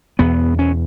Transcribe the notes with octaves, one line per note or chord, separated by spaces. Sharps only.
E2 B2 B3
C#4